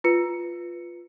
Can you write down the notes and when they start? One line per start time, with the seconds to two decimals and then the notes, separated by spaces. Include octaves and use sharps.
0.04 F4 B4 C#7